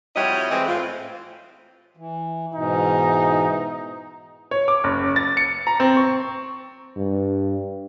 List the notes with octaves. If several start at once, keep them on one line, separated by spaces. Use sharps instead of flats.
F2 G3 E4 F#4 C#5 D#5
E3 G#3 A3 C4
A2 C4 F4
E3
G#2 B2 E3 D#4
C#5
D6
F#1
A6
C#7
A#5
C4
C#6
G2